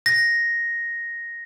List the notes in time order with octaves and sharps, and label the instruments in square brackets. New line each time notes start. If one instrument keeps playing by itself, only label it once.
[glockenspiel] A#6